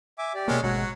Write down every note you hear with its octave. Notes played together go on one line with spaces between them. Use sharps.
E5 G#5 D6
G4 D5
B2 G#3 A#3 C#4
G#1 B2 F#3 G#3 C#5 F#5